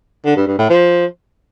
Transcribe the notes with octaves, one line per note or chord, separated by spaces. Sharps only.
D3
G2
G2
A2
F3